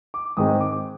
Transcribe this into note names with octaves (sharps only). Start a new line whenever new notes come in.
D6
G#2 D#3 G#3 C4 D#4 D#6
D6